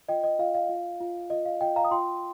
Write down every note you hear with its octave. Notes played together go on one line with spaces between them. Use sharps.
F4 D#5 G5
D#5
F4 F5
F5
F4
F4
F4 D#5
F5
F4 D#5 G5
F5 A#5
D#6
F4 G5 C6